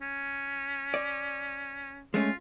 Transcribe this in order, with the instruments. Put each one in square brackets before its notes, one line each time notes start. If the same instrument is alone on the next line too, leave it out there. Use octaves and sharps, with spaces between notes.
[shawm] C#4
[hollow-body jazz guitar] D5
[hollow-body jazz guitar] G#3 A3 C#4 [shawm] F4